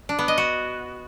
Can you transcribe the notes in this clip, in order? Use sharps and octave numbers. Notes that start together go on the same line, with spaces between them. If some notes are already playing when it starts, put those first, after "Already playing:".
D4
B3
D#5
F#4